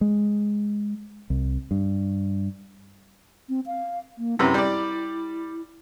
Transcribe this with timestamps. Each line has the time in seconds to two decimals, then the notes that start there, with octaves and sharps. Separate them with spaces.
0.01 G#3
1.30 C2
1.71 G2
3.49 C4
3.66 F5
4.18 A#3
4.39 F#2 C3 E4 B4
4.54 G3 D5